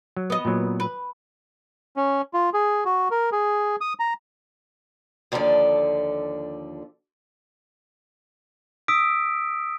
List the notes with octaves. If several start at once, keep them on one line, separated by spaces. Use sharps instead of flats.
F#3
B3 D#5
A#2 F#3
B4
C#4
F4
G#4
F#4
A#4
G#4
D#6
A#5
D#2 D3 F3 A4 D5
D#6 E6 B6 D7